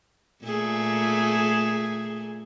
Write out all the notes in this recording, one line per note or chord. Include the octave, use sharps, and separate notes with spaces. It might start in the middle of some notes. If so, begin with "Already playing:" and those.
A#2 A3 G#4